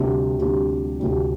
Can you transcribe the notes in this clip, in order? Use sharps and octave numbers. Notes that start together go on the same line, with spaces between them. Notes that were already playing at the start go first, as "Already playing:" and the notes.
Already playing: D2 C3 G3 D4 G4
D2 C3 G3 D4 G4
D2 C3 G3 D4 G4